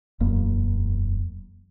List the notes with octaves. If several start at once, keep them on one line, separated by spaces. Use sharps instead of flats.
E1 F#2 A#3